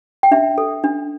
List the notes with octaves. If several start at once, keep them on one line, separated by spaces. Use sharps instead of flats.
G5
D4 E5
A4
D4